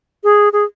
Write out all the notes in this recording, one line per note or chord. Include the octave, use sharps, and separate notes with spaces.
G#4
G#4